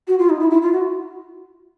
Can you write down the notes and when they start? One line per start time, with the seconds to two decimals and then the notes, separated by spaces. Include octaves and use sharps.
0.07 F#4
0.19 F4
0.29 D#4
0.39 E4
0.50 E4
0.62 F4
0.72 F#4